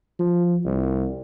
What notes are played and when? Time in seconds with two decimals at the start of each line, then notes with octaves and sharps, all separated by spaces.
0.19 F3
0.65 C2